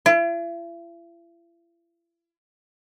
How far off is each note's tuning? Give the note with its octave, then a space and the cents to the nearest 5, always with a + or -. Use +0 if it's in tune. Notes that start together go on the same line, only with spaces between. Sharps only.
E4 +45